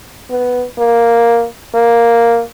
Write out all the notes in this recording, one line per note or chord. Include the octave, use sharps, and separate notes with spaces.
B3
A#3
A#3